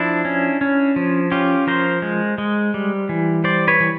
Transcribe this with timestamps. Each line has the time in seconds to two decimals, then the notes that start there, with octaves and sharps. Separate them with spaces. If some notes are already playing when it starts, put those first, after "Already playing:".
Already playing: F3 D4 E4
0.25 C#4
0.61 C#4
0.96 F3
1.32 C#4 F4 G4
1.67 F3 A#4 C5
2.02 G#3
2.38 G#3
2.74 G3
3.09 E3
3.44 G3 C5 D5
3.68 B4 C#5
3.80 E3